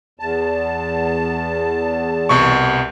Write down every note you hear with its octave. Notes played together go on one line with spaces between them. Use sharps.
E2 A5
C2 B2 C#6